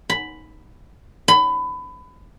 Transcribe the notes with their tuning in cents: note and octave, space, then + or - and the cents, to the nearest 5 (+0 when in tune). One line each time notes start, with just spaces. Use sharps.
B5 +5
B5 +25